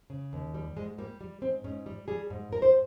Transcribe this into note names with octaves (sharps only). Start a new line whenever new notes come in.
C#3
D#2
G3
G#2 G#3
G3 A#3
G3
G#2 C4
G#2 C#4
G3
G3 G#4
G#2
G#2 A#4
C5